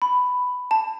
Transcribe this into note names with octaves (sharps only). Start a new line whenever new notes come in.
B5
A5